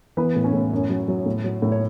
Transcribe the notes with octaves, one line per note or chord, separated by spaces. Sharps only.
E3 B3 B4
A2
C#4 C#5
A2
F#2
F#3
F#3
A2
F#3
A2
C#5